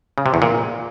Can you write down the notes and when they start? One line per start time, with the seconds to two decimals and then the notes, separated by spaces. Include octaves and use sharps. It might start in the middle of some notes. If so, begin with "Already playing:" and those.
0.18 C#3
0.26 C3
0.34 E2
0.42 A#2